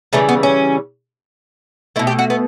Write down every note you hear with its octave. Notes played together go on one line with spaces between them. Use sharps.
C#3 E3 G3 A3
B3
C#4
B2 A3 E4
G4
F#4
B3